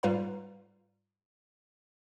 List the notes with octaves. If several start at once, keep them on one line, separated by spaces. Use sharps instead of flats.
G#2 G3 F4 B4 F5 A#5